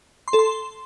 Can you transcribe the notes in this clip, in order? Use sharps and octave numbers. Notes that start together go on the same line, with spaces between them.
C6
A4
C6